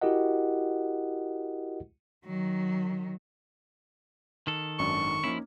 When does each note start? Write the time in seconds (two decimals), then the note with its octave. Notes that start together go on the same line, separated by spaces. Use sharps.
0.01 E4 F#4 G4 A#4 D#5 F#5
2.25 D#3 F#3
4.47 D#3 A4
4.79 G#1 F#2 D4 C#6
5.24 F3 A#3 C#4 D#4 E4